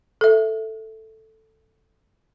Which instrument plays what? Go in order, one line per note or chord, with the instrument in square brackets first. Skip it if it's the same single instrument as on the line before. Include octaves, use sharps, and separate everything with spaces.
[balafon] A4 E5